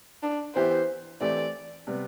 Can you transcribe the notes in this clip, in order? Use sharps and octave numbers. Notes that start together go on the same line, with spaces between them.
D4
E3 B3 E4 G4 C5
E3 A3 C4 G4 D5
C3 G3 B3